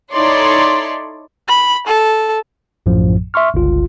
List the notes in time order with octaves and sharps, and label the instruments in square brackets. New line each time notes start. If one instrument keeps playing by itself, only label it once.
[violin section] D#4 E4 A4 C#5 D5 C6
[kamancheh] B5
A4
[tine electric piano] A#1 F#2 A2 F3
E5 C6 C#6 F6
G1 C#2 F4